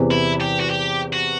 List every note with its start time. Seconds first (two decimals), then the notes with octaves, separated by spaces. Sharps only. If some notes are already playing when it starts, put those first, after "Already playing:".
Already playing: E2 C3 E3 B3
0.11 E4
0.41 G4
0.60 F#4
0.70 G4
1.13 F#4